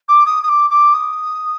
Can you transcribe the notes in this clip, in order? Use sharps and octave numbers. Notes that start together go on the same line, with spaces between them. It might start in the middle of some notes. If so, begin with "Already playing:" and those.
D6
D#6
D#6
D6
D6
D#6